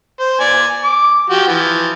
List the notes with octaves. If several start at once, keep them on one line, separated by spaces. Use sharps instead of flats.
C5
D5 G#5
D6
F3 F#4 G4
E3 F3